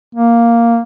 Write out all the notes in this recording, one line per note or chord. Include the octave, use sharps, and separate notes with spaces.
A#3